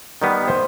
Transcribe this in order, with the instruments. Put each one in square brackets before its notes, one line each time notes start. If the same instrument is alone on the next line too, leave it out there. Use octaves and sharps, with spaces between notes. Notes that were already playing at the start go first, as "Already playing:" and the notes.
[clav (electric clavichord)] D#3 G3 B3
[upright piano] C5